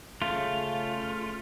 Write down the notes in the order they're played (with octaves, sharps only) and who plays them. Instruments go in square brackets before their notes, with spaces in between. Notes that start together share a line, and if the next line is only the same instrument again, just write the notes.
[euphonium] C#3 [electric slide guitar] A3 F4